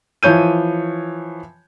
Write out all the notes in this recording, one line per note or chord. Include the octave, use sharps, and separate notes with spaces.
E3 F3 C#5 G6 D#7